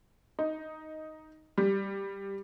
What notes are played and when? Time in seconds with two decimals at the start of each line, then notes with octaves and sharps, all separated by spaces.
0.39 D#4
1.58 G3